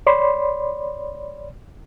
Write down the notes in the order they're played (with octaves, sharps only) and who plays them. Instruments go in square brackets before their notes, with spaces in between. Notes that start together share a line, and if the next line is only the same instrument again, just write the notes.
[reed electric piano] C#5 D5 B5 C6